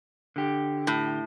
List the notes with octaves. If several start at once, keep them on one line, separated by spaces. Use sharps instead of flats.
D3 G4
A2